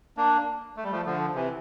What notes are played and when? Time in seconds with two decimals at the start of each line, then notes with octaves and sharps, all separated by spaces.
0.17 A#3 D4
0.76 A3
0.84 G3
0.91 F3 A3
1.05 D3 F3
1.34 C3 E3